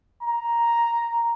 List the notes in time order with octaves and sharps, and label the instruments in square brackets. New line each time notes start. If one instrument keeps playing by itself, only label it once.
[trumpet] A#5